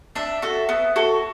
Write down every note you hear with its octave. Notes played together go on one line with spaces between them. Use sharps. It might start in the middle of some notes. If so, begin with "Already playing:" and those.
D4 E5
F#4 A4
B3
F#4 A4